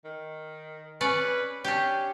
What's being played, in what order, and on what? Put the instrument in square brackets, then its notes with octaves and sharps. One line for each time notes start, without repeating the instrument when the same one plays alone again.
[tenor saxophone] D#3
[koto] C#4 D5 [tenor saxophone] B4
[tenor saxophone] C#4 [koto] D4 G4